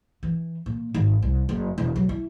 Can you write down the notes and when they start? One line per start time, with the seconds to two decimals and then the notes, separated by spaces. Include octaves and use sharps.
0.23 E3
0.66 A#2
0.94 G#1
1.22 C2
1.49 F#1
1.78 E1
1.96 F#3
2.09 E4